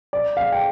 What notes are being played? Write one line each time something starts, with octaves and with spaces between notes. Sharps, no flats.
D5
F5
G5